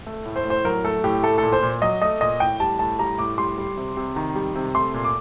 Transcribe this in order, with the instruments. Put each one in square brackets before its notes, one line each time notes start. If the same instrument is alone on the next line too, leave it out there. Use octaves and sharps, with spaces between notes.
[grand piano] A3
A2
C5
A2
C5
F#3 A#4
A3 A4
A2 G4
A3 A4
A#2 A4
C5
A#2
F#3 D#5
A3 D#5
A#2 D#5
A2 G5
G3 A5
A2 A5
G3 A#5
A2 D6
G3 C6
G3
C3
C3
D#3
G3
C3
A3 C6
A#2
D6